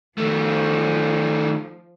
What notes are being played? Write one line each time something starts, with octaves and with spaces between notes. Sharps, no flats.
D#3 F3 A3